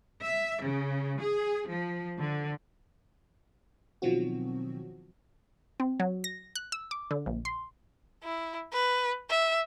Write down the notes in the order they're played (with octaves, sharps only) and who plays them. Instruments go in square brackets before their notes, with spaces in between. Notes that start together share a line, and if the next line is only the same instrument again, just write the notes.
[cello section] E5
C#3
G#4
F3
D3
[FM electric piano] B2 D#3 F3 F#3 C4 F#4
[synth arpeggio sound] C4
F#3
A#6
F#6
E6
D6
D3
A#1
C6
[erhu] E4
B4
E5